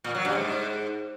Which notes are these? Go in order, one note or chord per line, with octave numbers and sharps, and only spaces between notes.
A#2
F#3
G2
G#2